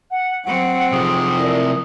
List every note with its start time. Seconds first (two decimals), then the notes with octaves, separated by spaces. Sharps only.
0.10 F#5
0.44 F#3 C4 F#5
0.92 C3 F3 G#4 D#6
1.37 E4 A#4 D5